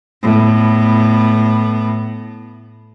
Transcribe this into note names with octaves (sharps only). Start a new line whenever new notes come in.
A2 B3